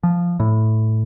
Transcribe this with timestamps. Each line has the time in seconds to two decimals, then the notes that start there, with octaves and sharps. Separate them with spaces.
0.03 F3
0.40 A2